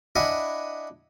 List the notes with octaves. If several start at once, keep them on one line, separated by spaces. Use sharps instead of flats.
D4 E4 D#5 F#5 G#5 B5